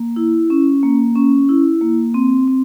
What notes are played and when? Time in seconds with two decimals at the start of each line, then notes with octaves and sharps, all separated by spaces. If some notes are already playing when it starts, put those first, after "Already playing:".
Already playing: A#3
0.16 E4
0.50 C#4
0.83 A#3
1.16 C#4
1.49 E4
1.81 A#3
2.14 C4
2.48 C4